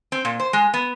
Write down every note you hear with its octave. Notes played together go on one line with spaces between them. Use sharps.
C4
A#2
C5
G#3
B3